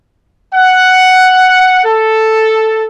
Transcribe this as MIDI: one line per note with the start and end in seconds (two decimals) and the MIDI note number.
0.54 1.82 78
1.85 2.86 69